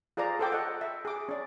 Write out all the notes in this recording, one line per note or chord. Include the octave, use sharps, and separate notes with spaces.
F4 G#4 C5 D5 A#5
A4 C5 G5 D6
D#5 F#5 G5
E5
G#4 D6
C#4 D5